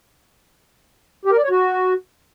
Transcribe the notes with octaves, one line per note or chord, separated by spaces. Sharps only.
G4
A#4
D5
C#5
F#4